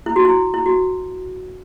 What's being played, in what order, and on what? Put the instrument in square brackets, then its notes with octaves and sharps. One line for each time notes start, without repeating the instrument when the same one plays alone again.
[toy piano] E4
F#4
E4
E4
F#4